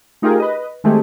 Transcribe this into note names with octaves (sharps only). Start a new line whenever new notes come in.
A3 D#4 F4 G4 G#4 A#4
B4 D#5
D#3 G#3 A3 C4 G4 G#4